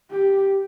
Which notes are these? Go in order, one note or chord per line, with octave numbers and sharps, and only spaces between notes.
G4